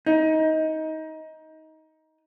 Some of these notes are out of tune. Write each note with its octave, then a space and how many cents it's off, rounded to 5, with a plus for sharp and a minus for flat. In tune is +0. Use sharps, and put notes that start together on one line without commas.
D#4 +20